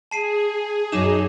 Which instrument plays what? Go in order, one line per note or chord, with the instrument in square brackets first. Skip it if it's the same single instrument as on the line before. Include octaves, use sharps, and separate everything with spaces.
[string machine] G#4 [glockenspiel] A5 C7 D#7
[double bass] F#2 [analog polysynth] B2 D#4 [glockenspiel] D6 E7